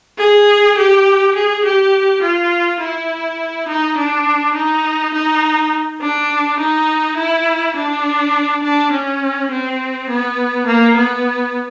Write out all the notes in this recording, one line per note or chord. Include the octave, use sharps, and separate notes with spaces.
G#4
G4
G#4
G4
F4
E4
D#4
D4
D#4
D#4
D4
D#4
E4
D4
D4
C#4
C4
B3
A#3
B3